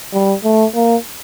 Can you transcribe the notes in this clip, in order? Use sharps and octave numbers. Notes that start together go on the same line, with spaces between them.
G3
A3
A#3